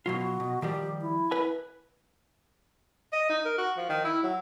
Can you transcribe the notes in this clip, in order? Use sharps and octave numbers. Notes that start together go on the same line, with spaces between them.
B2 F#3 F4 F#4
B2
D#3 F3 G3 G4
E4
B4 G#5
D#5
D#4
A#4
F#4
F3
D#3
E4
F#3